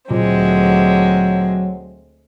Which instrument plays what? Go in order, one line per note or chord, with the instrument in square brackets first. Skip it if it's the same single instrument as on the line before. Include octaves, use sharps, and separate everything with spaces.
[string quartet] D2 G#3 C4 [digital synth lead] A#2 [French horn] F#3